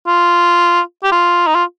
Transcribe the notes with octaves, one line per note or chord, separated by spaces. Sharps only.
F4
G4
F4
D#4
F4